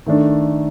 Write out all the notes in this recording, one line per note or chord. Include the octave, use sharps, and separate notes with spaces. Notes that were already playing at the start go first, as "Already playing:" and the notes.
D#3 A3 D4 A4